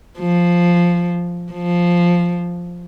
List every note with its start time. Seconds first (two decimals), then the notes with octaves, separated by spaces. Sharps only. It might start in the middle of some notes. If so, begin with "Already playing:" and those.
0.20 F3
1.52 F3